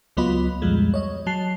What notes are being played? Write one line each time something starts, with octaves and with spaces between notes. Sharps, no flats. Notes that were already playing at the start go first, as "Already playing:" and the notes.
C#2 F#3 B3 F4 D#5 B5
F2 A#2 F3 G3 G#3
C#5 D#5
F#3 A5 C7